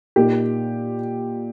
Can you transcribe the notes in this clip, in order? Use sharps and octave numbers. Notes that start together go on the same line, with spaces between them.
A#2 A#3 D#4 G4